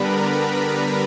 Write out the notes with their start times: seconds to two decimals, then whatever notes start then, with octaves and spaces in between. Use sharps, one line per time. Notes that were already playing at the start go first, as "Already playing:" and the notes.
Already playing: D3 G3 B3 D4 A#4 B4 A#5 B5